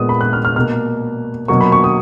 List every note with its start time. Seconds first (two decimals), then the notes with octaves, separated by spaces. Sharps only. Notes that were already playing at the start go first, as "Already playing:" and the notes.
Already playing: A#2 G#3 B3 D#6
0.09 B5
0.21 F#6
0.33 F6
0.45 F6
0.56 B2 A#3 F6
1.48 B2 F#3 A#3 C#6
1.61 B5
1.72 C#6
1.84 D#6